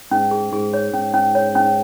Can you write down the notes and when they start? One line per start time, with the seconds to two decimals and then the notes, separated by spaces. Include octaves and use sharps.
0.11 G#2 C#4
0.31 G#4
0.52 G#2 G#4
0.73 C#5
0.94 G#2 C#4
1.14 C#4
1.35 C#5
1.55 C#4